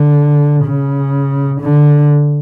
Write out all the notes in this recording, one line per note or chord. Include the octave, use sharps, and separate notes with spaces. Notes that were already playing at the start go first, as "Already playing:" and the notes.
Already playing: D3
C#3
D3